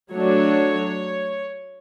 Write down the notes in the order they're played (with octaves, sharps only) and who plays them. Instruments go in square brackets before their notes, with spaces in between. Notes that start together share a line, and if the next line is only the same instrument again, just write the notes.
[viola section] F#3 A3 D4 C#5